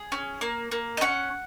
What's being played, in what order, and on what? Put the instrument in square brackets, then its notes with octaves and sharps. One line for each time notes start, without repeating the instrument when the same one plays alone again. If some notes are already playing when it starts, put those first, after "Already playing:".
Already playing: [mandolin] G#4
C#4
A#3
A#3
D#5
C#4 F#5